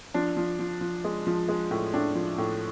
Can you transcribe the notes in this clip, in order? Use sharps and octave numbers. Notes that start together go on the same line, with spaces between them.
F3 D4
F3
F3
F3
G#3
F3
G#3
A2
A2 D4
F3
A2